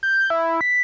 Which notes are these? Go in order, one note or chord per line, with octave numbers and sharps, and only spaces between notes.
G6
E4
B6